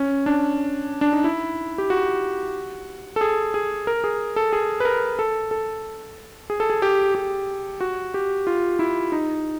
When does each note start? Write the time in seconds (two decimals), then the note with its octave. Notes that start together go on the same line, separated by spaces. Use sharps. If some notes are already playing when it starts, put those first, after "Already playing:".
Already playing: C#4
0.26 D4
1.01 D4
1.13 D#4
1.24 E4
1.78 G4
1.90 F#4
3.16 A4
3.21 G#4
3.54 G#4
3.87 A#4
4.04 G#4
4.36 A4
4.53 G#4
4.80 B4
4.85 A#4
5.19 A4
5.51 A4
6.50 G#4
6.60 A4
6.70 G#4
6.82 G4
7.15 G4
7.81 F#4
8.14 G4
8.47 F4
8.79 E4
9.12 D#4